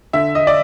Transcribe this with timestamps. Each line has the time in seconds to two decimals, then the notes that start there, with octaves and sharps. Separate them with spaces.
0.13 D3 E5
0.35 D#5
0.47 D5